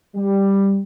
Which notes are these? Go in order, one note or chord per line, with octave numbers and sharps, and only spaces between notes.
G3